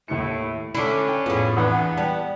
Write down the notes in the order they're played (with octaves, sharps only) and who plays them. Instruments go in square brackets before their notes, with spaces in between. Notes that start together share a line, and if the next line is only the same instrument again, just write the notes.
[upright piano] D#2 C#7 [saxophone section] A2
[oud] D3 E4 [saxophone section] C#4 D4 [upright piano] A4 B5
[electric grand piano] G5
[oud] F2 A2 [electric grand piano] B3 G#4 [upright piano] F4
[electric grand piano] E2 E3 D4 [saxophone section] B3 [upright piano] F#5 D#6 F#6
[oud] G3 [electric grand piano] A5